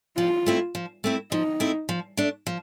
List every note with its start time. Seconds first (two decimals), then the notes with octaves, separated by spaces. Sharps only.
0.17 F3 F4
0.46 A3 C4 E4
0.75 F3
1.04 A3 C4 E4
1.32 F3 D#4
1.60 A3 C4 E4
1.89 F3
2.17 A3 D4
2.47 F3